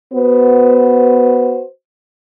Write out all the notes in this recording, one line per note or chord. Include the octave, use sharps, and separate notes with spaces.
B3 F#4 B4 C5